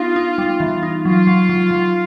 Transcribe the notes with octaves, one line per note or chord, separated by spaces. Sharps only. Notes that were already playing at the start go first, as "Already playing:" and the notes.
Already playing: B3 D#4 F4
D#4
G3
E3
D#4
F#3 F4
F#3
F#3
F#3